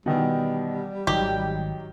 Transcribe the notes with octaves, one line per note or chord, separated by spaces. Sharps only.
B2 D#3 E3 G3 B3
G#1 D#3 F#3 G4